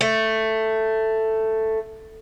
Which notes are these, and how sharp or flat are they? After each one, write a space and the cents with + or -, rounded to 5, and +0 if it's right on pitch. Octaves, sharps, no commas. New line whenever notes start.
A3 +5